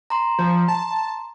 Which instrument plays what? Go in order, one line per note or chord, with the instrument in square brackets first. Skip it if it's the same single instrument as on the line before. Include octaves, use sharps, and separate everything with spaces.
[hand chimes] A#5 C6
[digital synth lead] F3
A5